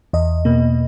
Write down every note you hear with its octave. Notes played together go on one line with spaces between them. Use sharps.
E2 D#5
B2 A#3